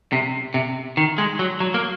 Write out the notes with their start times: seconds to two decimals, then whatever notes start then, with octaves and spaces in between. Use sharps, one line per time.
0.13 C3
0.54 C3
0.97 D#3
1.18 G#3
1.39 F#3
1.60 F#3
1.74 A#3